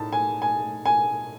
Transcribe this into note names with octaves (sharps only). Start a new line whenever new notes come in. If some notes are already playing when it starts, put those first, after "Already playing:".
Already playing: A2 D#4 A5
G#5
G#5
G#5